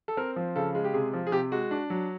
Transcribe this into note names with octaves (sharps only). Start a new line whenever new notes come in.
A4
C4 A#4
F3
C#3 A4
G#3
G4
C3 G#4
F3
G#4
C3 G4
G#3 F#4
D4
F#3